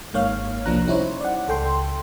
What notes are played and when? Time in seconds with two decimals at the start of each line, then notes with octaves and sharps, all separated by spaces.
0.14 G#1 G#2 A#3 C#5 F5 F6
0.65 C2 F3 A#3 D4 A#5 F#6
0.87 G3 C#4 D#4 E4 C5 C#5
1.21 D5 F#5
1.48 C#2 A4 G5 C6